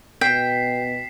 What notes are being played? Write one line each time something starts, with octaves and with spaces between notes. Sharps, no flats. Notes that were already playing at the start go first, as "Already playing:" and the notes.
B2 G5 B6 C7 E7